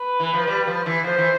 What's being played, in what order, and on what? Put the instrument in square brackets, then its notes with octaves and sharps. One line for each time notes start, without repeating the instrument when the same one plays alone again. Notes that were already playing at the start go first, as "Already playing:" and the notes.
Already playing: [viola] B4
[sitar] E3
F3
G3
F3
E3
[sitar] F3 [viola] C5
[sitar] E3